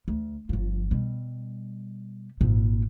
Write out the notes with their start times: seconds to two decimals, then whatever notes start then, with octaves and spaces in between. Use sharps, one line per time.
0.08 D2
0.49 G1 F3
0.91 B2 G3
2.41 G#1 A#2